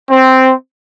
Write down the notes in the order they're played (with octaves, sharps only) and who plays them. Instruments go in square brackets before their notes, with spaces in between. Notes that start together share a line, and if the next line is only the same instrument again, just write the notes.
[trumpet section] C4